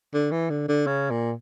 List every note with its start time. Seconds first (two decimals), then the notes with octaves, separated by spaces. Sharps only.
0.14 D3
0.32 E3
0.50 D3
0.68 D3
0.87 C#3
1.10 A#2